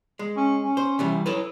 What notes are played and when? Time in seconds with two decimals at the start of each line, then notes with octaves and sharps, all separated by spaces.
0.19 G#3
0.37 C#4
0.64 C#4
0.77 C5
0.99 C3 E3 G3
1.26 F#3 E4 A4 B4